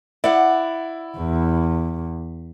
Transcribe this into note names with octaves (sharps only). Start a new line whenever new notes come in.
E4 D5 F#5
E2